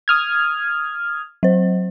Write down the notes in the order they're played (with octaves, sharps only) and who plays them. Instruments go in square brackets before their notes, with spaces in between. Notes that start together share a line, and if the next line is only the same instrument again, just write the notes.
[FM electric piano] D#6 F6 G#6
[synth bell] F#3 C5